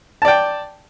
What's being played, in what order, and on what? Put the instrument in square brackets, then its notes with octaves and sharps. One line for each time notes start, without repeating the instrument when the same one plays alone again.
[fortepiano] A5
D5
G5